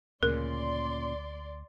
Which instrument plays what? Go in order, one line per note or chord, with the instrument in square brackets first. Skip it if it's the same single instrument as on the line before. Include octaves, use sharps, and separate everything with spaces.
[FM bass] D2 [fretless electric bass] A#2 C#3 [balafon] A#4 [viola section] D5 C6